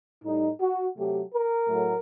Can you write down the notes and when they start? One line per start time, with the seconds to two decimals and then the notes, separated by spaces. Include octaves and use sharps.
0.25 A2 G3 D#4
0.61 F#4
0.97 C3 F#3 A3 G4
1.33 A#4
1.69 A2 F#3 A3